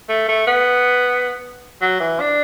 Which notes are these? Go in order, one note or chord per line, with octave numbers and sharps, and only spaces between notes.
A3
A3
B3
F#3
E3
D4